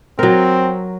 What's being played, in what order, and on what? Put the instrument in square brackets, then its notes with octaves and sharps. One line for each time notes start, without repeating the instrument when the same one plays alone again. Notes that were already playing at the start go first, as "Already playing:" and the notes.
[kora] F#3 A#4 [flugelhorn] C4